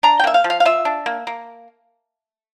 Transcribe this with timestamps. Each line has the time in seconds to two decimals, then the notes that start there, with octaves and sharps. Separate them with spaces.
0.03 D4 A#5
0.19 G5
0.24 A#3 E5
0.34 F5
0.44 F3
0.50 F5
0.60 F5
0.65 F4 E5
0.85 D4
1.06 A#3
1.27 A#3